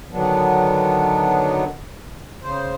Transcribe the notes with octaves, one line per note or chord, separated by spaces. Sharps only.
D3 D#3 F#3 B3 D4
C#3 C5